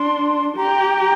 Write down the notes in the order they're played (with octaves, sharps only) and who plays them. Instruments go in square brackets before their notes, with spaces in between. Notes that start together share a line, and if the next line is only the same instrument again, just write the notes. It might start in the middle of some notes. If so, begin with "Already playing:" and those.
Already playing: [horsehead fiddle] D4 [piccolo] C6
[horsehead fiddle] G4 [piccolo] A#5